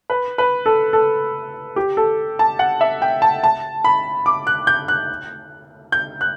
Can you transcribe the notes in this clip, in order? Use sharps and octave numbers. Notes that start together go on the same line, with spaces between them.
B4
B4
A4
A4
G4
A4
A5
F#5
E5
G5
A5
A5
B5
D6
F#6
G6
F#6
G6
F#6